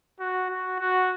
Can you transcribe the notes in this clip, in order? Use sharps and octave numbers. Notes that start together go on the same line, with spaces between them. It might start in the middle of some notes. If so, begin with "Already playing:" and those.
F#4
F#4
F#4